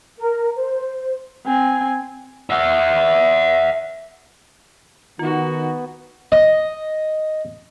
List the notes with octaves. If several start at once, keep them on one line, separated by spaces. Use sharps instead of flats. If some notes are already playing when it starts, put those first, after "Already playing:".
A#4
C5
C4 G#5
E5 F#5
D#3 B3 D#4 F4 F#4
D#5